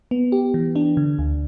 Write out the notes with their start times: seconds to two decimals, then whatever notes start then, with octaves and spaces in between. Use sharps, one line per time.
0.11 B3
0.32 G4
0.54 E3
0.76 D4
0.97 D3
1.19 D2